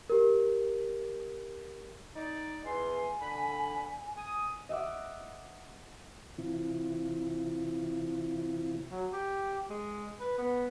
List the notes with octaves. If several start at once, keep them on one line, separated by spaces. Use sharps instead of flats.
G4 A#4
D#4 D5
E2 G#5 C6
D3 B5
G#5 D#6
D#5 E5 F#5 D6
C3 E3 C4 E4 F4
F#3
G4
G#3
B4
B3